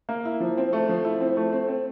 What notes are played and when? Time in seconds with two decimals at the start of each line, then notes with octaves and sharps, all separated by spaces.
0.09 A#3
0.25 E4
0.40 F3
0.57 C4
0.73 A3
0.89 F3
1.05 E4
1.21 C4
1.37 A3
1.53 C4
1.69 C4